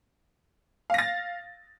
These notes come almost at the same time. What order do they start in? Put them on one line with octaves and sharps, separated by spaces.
F5 A#6 A6